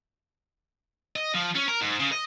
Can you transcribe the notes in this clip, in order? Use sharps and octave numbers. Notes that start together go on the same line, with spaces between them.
D#5
F3
C#4
A#4
G#2
C#3
D#5